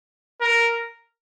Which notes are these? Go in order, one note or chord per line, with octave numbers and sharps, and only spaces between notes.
A#4